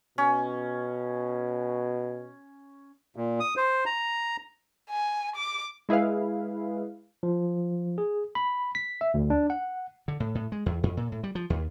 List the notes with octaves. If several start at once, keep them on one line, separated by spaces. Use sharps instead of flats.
B2 C#4
A#2
D#6
C5
A#5
G#5
D6
G#3 E4 G#4 B4 F5
F3
G#4
B5
B6
E5
D2
D4
F#5
D3
A2
A2
G#3
E2
F2
A#2
A2
G3
F3
D#2